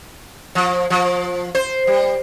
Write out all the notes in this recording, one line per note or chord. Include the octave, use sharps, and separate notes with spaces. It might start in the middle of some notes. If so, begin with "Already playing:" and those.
F3
F3
C5
G3